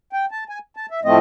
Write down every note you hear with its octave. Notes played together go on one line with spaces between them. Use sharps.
G5
A5
G#5
A5
E5
A2 F3 A3 C4 D#5